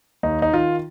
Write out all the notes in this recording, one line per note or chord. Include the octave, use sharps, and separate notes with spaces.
D#2 D#4
D#4
D#3 F4